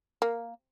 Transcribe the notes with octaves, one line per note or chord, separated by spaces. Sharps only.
A#3